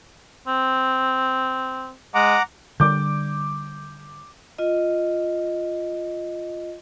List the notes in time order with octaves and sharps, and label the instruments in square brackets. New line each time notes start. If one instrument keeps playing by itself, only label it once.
[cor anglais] C4
[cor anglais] G#3 [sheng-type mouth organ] F#5 A#5 D6
[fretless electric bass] D3 G3 [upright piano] D6 G6
[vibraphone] F4 D#5